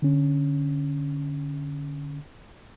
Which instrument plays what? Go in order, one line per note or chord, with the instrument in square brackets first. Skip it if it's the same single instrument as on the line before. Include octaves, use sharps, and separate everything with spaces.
[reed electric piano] D3 C#4